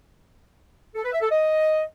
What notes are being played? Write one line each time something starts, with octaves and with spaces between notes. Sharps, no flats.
A4
B4
E5
A4
D#5